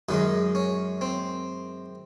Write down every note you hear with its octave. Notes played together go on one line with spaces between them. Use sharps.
F#2 D#3 G#3 D#4
C#4
C4